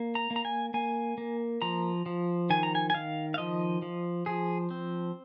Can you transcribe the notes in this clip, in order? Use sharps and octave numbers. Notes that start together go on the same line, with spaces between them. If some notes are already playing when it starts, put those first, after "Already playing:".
Already playing: A#3
A#5
A#3
A#5
G#5
A#3 G#5
A#3
F3 A#5
F3
D#3 G#5
A#5
G#5
G#5
D#3 F5
F5
F3 D#5
F3
F3 G#4
C4